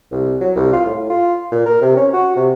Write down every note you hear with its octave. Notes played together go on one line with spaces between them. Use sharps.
C2
F#3
C2
F4
A2
F4
A#2
A#4
C3
C#4
F#4
C3